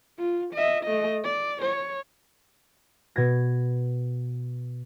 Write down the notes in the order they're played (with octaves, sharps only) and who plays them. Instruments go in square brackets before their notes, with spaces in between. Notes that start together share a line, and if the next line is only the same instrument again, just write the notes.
[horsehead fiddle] F4
D#5 E5
A3 D#5
D5
C#5
[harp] B2 G#6 A#6